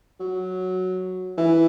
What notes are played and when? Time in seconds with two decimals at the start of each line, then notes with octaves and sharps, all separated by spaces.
0.20 F#3
1.38 E3